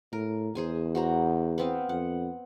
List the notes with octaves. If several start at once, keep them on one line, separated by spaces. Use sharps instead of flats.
A2 A#4
E2 G#4 C5 G#5
F#4 C5 A#5
B3 C4 F5
F2 F#5